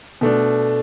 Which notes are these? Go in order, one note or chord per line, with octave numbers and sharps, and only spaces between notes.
B2 A3 D4